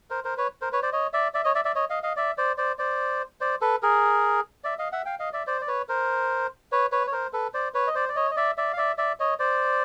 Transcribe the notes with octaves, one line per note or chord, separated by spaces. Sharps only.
A#4 C5
A#4 C5
B4 C#5
A#4 C5
B4 C#5
C5 D5
C#5 D#5
D5 E5
D5 E5
C#5 D#5
D5 E5
D5 E5
C#5 D#5
D#5 F5
D#5 F5
D5 E5
C5 D5
C5 D5
C5 D5
C5 D5
A4 B4
G#4 A#4
D5 E5
D#5 F5
E5 F#5
F5 G5
D#5 F5
D5 E5
C5 D5
D5
B4 C#5
A#4 C5
B4 C#5
B4 C#5
C#5
A#4 C5
A4 B4
C5 D5
B4 C#5
D#5
C5 D5
D5
C#5 D#5
D#5
D5 E5
D5 E5
F5
D5 E5
D5 E5
C#5 D#5
C5 D5